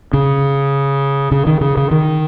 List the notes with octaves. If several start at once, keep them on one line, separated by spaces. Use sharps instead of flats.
C#3
C#3
D#3
C#3
C#3
D#3